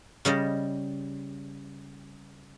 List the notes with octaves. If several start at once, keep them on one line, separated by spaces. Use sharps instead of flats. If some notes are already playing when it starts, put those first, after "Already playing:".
C#3 G3 D#5 A5